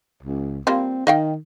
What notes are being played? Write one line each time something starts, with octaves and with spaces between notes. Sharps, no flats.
C#2
G3 A#3 C4 F4
D#3 D#5 F5 G5